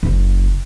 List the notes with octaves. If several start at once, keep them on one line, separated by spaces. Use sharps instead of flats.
F#1